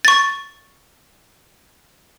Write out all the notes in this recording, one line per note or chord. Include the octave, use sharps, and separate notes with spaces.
C#6 A6